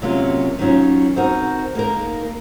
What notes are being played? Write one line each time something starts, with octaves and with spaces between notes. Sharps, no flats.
C3 F#3 A#3 C#4 F4
D#3 F#3 C#4 F4
C4 D#4 F#4 A#4
A#3 D#4 A#4